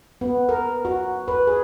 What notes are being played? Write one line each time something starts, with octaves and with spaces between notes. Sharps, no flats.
B3
A#4
F#4
B4
G#4